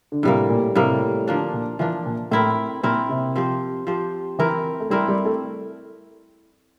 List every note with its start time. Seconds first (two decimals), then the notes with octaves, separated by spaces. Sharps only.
0.12 D3
0.23 A2 C3 G3 A#3
0.50 A#2
0.75 A2 C3 G3 A#3
1.28 D3 F3 A#3 D4
1.53 A#2
1.79 E3 F3 A#3 D4
2.06 A#2
2.31 A2 C4 E4 A#4
2.83 A#2 C4 E4 A#4
3.09 C3
3.36 F3 C4 G4 C5
3.87 F3 C4 G4 C5
4.39 E3 C4 E4 A#4
4.80 A3
4.90 G3 C4 E4 A#4
5.08 G3
5.25 A3